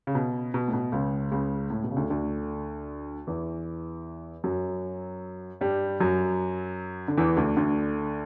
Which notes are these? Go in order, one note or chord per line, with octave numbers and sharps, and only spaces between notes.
C#3
B2
B2
A2
B2
C#2 C#3
C#2 C#3
A2
B2
C#3
D2 D3
D2 D3
E2 E3
F#2 F#3
G2 G3
F#2 F#3
D3
E2 E3
D2 D3
D2 D3